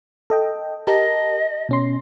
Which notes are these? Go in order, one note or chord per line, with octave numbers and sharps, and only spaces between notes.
A4 D#5 G5
G4 A#4 D#5 A5
B2 C#4 C6